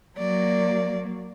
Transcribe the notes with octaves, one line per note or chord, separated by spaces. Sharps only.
F#3 A#3 D5